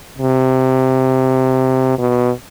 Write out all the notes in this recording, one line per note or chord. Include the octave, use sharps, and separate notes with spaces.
C3
B2